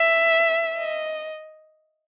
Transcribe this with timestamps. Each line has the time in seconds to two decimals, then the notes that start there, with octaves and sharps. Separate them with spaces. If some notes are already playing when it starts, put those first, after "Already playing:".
Already playing: E5
0.78 D#5